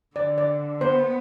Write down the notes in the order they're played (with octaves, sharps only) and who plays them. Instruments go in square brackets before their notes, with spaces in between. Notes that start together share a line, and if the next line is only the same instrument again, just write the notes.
[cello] D3 [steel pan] D5
[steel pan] D5
[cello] B3 [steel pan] C5